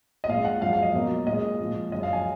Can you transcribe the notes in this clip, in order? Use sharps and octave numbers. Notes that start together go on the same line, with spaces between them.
D#5
A#2 G#3 F5
F#5
F#2 F3 G#3 F5
F5
D#5
B2 F#3 A#3
A#2 G#3 D#5
A#2 F3 G#3
F#2 C#3 F3 D#5
F5
G#5